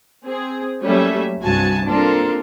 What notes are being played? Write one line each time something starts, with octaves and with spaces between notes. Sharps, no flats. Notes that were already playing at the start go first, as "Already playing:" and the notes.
C4 G#4
F#3 G3 A3 A#3 C#4 E5
C2 G2 C3 F#4 G#5 A5
A#3 C4 D4 F4 A4 A#4